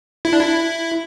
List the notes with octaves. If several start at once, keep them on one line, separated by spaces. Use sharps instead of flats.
E4
D4
E4